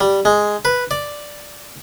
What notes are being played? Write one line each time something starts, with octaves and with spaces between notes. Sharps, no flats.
G3
G#3
B4
D5